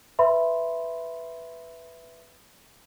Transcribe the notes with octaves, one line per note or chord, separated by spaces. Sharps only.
B4 E5 B5 C6